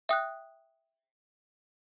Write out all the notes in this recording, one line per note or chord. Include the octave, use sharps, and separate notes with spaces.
E5 G5 D#6 F#6